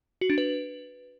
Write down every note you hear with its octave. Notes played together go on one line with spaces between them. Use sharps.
F#4
D4
B4